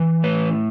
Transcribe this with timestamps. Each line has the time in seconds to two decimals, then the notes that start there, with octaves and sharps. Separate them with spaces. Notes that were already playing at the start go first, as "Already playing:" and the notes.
Already playing: E3
0.23 A2 B4